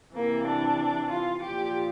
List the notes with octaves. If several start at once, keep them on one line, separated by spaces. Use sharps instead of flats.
C3 E3 A#3
D4
F4
A#2 F3 G4